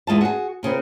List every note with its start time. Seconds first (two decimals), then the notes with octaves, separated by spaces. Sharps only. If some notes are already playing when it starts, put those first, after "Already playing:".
0.07 E2 G#3 F4 A5
0.21 F#4 G#4
0.63 A#2 C#3 C4 B4